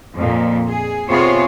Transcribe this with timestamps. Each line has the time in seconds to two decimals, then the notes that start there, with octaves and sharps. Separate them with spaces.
0.16 F2 A#2
0.69 G#4
1.09 C3 B3 F4 G#4 C5 C#5